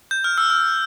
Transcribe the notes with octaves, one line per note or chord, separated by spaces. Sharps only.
G6
F6
E6
F6